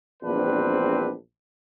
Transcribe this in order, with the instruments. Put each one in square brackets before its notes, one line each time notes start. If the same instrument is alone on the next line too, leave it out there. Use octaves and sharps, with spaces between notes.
[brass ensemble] A#1 E2 G3 C4 D4 B4